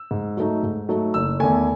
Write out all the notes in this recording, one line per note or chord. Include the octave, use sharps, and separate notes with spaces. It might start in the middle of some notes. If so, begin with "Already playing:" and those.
Already playing: E6
G#2
F#3 A3 D#4
G#2
F#3 A3 D#4
F#1 E6
E2 D#3 A3 G#5